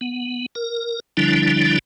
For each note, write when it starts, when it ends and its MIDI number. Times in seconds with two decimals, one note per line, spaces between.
0.01 0.46 59
0.55 1.00 70
1.17 1.79 50
1.17 1.79 53
1.17 1.79 55
1.17 1.79 62
1.17 1.79 64